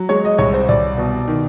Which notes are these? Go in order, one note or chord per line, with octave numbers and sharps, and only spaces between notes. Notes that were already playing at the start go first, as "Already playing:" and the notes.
Already playing: F#3
G#3 C#5
D#5
C2 C#5
C5
C2 D5
B2
D#3